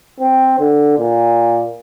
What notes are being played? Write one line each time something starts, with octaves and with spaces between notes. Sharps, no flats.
C4
D3
A#2